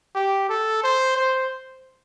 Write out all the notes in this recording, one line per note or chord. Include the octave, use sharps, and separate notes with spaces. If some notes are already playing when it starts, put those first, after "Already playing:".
G4
A4
C5
C5